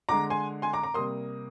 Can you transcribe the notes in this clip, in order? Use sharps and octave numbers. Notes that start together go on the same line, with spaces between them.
D3 G#3 A#5 D6
G#5 C6
G#5 C6
A#5 D6
A#5 D6
C3 G3 A#3 C6 D#6